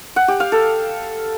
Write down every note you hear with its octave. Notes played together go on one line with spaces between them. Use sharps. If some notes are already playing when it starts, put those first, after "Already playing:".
F#5
G4
F5
A4